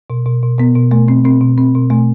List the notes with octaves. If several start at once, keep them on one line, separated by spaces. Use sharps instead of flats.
B2
B2
B2
B2 B3
B2
B2 A3
B2 C4
B2 C4
B2
B2 C4
B2
B2 A3